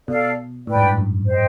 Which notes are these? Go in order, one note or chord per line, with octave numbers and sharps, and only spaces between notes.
B2 A4 D5 F5
A2 B4 D5 G5
G#2
G2
F#2
C5 D#5 G5